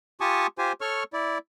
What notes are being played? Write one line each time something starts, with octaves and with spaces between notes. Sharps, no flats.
F4 G4 G#5 A5 C#6 D#6
F4 G4 C5 G#5
A4 C#5 C#6 F6
E4 D5